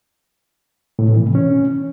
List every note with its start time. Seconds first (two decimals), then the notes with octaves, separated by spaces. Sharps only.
0.99 A2
1.08 B2
1.17 E3
1.26 C3
1.35 C#4